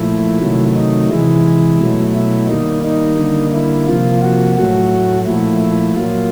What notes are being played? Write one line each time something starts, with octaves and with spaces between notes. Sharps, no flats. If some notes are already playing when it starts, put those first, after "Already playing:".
Already playing: A#2 F3 A3 E4
C3 D#3 F#3 A3
D#4
C3 E3 G#3 E4
B2 F#3 A3
E4
D#3 G3 A#3 D#4
D#4
D3 G3 A#3
E4
C3 F3 A#3 F4
F#4
A2 F#3 A3 F#4
A#2 F3 A3 E4
E4
A#2 F#3 A#3 F4